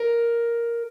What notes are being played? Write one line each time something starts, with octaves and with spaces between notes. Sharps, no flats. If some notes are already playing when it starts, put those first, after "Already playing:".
Already playing: A#4